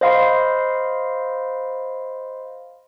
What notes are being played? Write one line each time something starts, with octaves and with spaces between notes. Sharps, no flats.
C5 D#5 F5 B5 C6